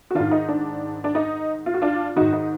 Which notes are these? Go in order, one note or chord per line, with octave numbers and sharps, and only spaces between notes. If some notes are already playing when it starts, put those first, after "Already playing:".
F#4
G#2 D#3 D4 F4
D#4
D4
D4
D#4
F4
F#4
D4 F4
G#2 D#3 D#4 F#4
D#4